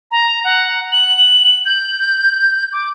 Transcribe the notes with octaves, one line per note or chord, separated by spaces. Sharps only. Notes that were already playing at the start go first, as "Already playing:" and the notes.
A#5
F#5
F#7
G6
D6